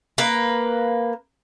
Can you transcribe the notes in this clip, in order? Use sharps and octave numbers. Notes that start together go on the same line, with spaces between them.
A#3 B4